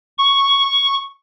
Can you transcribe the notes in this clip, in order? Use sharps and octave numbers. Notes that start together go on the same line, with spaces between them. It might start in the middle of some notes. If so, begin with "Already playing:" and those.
C#6